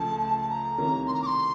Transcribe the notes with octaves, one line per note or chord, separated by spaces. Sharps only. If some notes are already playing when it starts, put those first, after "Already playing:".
Already playing: C#2 C#3 F3 A3 A5
A5
A#5
C2 C3 D#3 A#3 C#4
C6
A#5
D6
C6